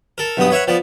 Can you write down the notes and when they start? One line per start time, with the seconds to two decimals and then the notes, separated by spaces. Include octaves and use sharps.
0.18 A4 A#4
0.37 B1 G2 B3 D#6
0.51 B4 C#5 E5 F#5
0.67 F3 B3 D5